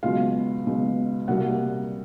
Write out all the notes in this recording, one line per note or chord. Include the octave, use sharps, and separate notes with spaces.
C#2 B2 F#3 F4 F5
C#2 B2 F#3
C2 A#2 G3 A#3 F#4 F#5